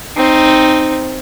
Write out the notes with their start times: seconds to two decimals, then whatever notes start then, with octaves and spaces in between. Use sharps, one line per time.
0.17 C4 D#4